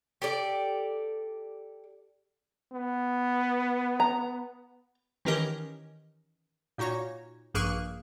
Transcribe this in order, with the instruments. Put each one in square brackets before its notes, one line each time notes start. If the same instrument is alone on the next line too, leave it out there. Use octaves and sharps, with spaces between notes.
[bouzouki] G4 A4 D5
[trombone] B3
[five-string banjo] A#5
[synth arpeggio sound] D#3 E3 C#4 G4 A#4 D#5
A#2 D#4 F#4 C#5 A#6
A#1 G2 A#3 G#4 C#6 F#6